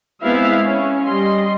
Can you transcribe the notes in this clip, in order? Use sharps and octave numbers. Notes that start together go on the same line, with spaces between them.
G#3 B3 C4 E4 E5 F5
C#4
G3 D#5 C6